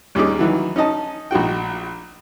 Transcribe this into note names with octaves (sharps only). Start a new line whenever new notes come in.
D#2 G3 C#4 D#4 G#4 D6
D#3 E3 F#3
C#4 D#4 D#5 A5
A#1 D#4 F#4 G5